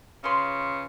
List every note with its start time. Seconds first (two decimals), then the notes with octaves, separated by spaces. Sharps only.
0.24 C#3 F4 B4 C6